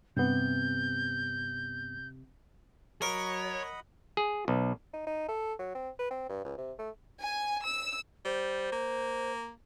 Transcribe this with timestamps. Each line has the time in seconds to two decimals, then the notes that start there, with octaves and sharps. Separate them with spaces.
0.17 G2 C3 B3 G6
3.02 F#3 A#4 C#5 D#5 F#5 B5
4.17 G#4
4.48 B1
4.93 D#4
5.07 D#4
5.28 A4
5.59 F#3
5.75 C4
5.99 B4
6.11 C4
6.29 G2
6.45 C#2
6.58 C3
6.79 A3
7.21 G#5
7.65 E6
8.25 G3 C5
8.72 A#3